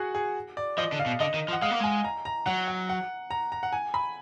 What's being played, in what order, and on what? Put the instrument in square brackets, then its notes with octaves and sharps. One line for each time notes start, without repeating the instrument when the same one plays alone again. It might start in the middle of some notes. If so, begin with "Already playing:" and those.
Already playing: [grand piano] F#4 G#4 F#5
G#4
D5
[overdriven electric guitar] F3 [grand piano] D#5
[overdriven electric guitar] D3
[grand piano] F5
[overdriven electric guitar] B2
[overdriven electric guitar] D3 [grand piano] D#5
[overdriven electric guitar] D#3
F3
[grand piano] F#5
[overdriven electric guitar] G#3 [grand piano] F5
[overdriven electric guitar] A#3
[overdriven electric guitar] G#3 [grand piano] G#5
[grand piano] A#5
A#5
[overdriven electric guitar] F#3 [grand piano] F#5
[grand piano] F#5
F#5
A#5
A#5
F#5
G#5
B5